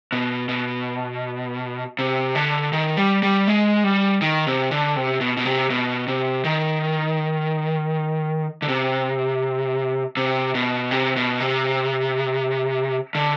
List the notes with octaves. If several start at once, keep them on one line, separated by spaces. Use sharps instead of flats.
B2
B2
C3
D3
D#3
G3
G3
G#3
G3
D#3
C3
D3
C3
B2
B2
C3
B2
C3
D#3
D3
C3
C3
B2
C3
B2
C3
D3